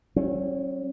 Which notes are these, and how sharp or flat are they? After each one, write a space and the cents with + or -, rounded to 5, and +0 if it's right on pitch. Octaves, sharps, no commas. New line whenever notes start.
F#3 +40 C#4 -35